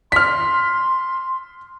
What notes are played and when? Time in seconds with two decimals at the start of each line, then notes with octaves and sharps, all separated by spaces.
0.12 C6 F6 B6